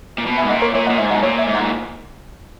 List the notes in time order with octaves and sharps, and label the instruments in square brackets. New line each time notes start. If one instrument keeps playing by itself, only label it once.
[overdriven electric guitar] A#2
B2
[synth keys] E5 G#5
[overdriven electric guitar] G#2
[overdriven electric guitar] A#2 [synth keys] D#5 F#5
[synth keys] A#4 C#5
[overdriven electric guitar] A#2 [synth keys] C#5 E5
[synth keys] D#5 F#5
[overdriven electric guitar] A#2
[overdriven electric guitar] G#2 [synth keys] E5 G#5
[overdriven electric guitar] B2 [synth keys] D#5 F#5
[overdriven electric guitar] A#2 [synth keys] C#5 E5
[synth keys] E5 G#5
[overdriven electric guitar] G#2
[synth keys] F#5 A#5
[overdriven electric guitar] A#2